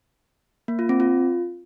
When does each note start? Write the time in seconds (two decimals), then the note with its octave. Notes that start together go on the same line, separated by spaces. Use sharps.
0.68 A#3
0.79 F4
0.89 C4
1.00 F4